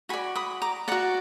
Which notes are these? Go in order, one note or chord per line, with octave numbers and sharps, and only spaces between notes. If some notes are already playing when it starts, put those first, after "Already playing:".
F#4 D5 G#5 B5
B5 D#6
A#5 D6
F#4 D5 F#5 A#5